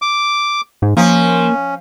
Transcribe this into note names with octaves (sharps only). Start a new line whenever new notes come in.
D6
G#2
F3 A#3 C#4